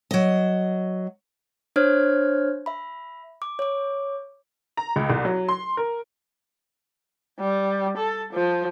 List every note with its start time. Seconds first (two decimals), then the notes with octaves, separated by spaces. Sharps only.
0.11 F#3 D#5
1.76 D4 C5 C#5 F6 G#6
2.66 E5 B5
3.42 D6
3.59 C#5 D6
4.77 A#5
4.96 C#2
5.10 C2
5.25 F#3
5.49 C6
5.77 A#4
7.39 G3
7.98 A4
8.33 F3